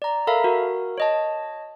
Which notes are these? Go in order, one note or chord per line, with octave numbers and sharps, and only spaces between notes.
D5 A#5
A4 A#4 E5 F5 A#5 B5
F#4 A#4
C#5 D#5 A5